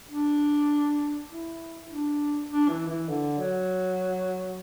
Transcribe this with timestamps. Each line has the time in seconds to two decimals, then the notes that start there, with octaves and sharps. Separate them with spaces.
0.09 D4
1.29 E4
1.88 D4
2.49 D4
2.69 E3
2.88 E3
3.09 D3
3.39 F#3